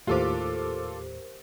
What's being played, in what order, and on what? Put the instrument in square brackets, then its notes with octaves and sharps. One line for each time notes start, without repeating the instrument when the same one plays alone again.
[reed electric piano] D#2 A2 [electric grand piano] F4 A4 D6 [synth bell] G4 A#4 C5